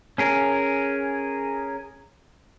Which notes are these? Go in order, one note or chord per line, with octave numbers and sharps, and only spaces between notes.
C#4 G#4 A#4